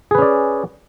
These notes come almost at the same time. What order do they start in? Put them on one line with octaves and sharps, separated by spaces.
G#4 B4 C#4 D5